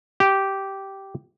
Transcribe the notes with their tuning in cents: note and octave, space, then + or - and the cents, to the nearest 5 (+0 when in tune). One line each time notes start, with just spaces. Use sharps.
G4 -10